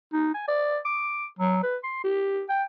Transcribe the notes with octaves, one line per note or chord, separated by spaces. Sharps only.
D#4
G#5
D5
D6
F#3
B4
C6
G4
G5